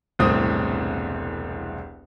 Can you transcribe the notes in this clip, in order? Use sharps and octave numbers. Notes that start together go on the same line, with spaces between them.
E1 C2 A2 C4 D#6